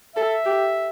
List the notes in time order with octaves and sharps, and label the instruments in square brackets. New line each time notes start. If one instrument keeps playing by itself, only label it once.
[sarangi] A4 [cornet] E5
[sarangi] G4